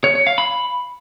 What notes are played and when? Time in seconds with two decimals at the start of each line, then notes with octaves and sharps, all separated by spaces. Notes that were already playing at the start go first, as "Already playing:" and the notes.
0.04 C#5
0.15 C#5
0.27 F5
0.38 B5